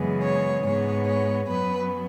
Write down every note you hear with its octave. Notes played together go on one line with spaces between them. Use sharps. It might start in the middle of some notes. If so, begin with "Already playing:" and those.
Already playing: F#2 C#3 E3 G#3 B3
C#5
G#2 G#3 B3 C#5
C#5
F#2 F#3 B3 B4